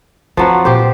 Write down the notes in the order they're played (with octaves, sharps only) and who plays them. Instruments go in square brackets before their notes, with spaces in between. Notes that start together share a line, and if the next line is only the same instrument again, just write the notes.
[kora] F3 F#3 B4 [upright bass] C4
[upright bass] A#2 [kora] G4 C5